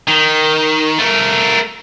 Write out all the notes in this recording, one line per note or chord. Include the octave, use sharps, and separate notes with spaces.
D#3
A3 A#4